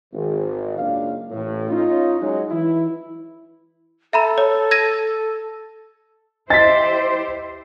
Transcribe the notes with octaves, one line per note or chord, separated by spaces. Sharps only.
G#1
C#2 F#2 A#3 D4 F5
A1 A2
C#4 D#4 F4
F#3 G#3 D#4
E3 E4
A4 E5 A#5 B5
C#5
G#6 A#6 D#7
E4 G4 C5 D#5 A6 B6